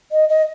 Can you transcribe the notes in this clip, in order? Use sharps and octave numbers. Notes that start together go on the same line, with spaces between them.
D#5
D#5